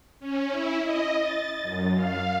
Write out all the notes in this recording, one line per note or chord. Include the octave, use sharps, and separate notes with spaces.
C#4
E4
D#5
A6
F#2
F5